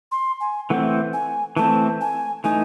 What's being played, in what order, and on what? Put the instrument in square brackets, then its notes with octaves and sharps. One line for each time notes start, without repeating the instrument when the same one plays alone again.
[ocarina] C6
G#5
[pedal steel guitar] E3 A3 C4 [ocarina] F#5
[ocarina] G#5
[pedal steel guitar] E3 A3 C4 [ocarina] A5
[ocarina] G#5
[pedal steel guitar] E3 A3 D#4 [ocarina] G#5